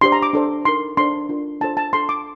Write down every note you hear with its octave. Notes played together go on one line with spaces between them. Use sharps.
D4 G4 C5 C6
A#5
D6
D4 A4 C5
D#4 A#4 C6
D4 A4 C5 C6
D4 F4 A#4
D4 F4 A4 C5 A5
A5
D4 A4 C5 C6
D6